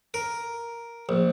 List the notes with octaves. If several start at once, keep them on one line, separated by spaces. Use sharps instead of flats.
A#4
A#1